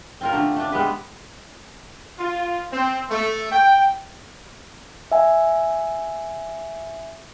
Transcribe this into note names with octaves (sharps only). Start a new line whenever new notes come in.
C4 F4 A#4
D3 A3
A3 D4
G3 G#3 B3 B4
F4
C4
A3
G5
E5 G#5